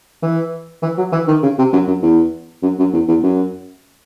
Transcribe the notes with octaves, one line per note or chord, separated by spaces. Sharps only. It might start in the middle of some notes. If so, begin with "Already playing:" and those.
E3
E3
F#3
E3
D#3
C#3
C3
F#2
F#2
E2
F#2
F#2
E2
E2
F#2